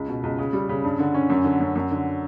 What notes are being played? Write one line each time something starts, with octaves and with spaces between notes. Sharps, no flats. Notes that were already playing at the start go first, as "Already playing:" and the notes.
Already playing: C#2
B2
C#2
C#3
G3
C#3
G2
D3
C#4
F#2
D3
F#2
F#2
D3